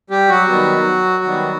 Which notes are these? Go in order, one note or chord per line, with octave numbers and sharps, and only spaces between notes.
G3 G4
F#3 F#4
D#3 G3 B3
D#3 G3 B3